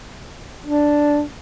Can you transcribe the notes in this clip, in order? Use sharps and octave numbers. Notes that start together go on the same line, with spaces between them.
D4